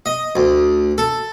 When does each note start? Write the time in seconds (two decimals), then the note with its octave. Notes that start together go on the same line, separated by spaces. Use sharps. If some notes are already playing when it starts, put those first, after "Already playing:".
0.06 D#5
0.36 D2
0.98 A4